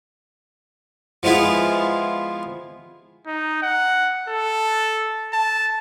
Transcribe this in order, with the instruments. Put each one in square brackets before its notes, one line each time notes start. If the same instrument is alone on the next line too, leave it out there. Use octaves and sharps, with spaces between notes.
[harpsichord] F3 G#3 B3 E4 F4
[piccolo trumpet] D#4
F#5
A4
A5